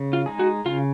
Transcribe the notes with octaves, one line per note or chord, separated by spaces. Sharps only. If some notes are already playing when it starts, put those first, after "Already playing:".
Already playing: C#3
F4
G#3 D#4 G#4
F#4
C#3 F4